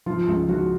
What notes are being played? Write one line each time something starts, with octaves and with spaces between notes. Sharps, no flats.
F3 F4
C#2
F3 F#4